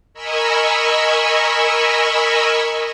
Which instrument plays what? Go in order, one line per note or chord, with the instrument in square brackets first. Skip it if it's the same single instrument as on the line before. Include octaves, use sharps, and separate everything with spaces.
[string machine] A#4 D#5 G#5 B5 C#6 E6